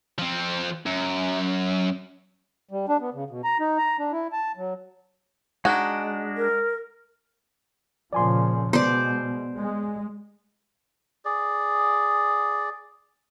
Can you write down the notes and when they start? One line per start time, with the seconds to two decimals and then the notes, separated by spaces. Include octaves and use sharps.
0.19 F3 C4
0.86 F#2
2.71 G3
2.89 D4
3.01 B3
3.14 C#3
3.30 B2
3.44 A#5
3.60 D#4
3.78 A#5
3.99 D4
4.12 E4
4.32 A5
4.57 F#3
5.65 G#3 D4 D#4 F#4
6.37 A#4
8.13 A#2 C#3 F3 D5 G#5 C6
8.73 B2 G#3 B3 C5 D5
9.59 G#3
11.25 G#4 D5